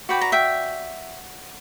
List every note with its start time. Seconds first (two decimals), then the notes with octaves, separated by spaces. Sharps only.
0.09 F#4 B4 D5 G5
0.21 A#5
0.32 E5 G5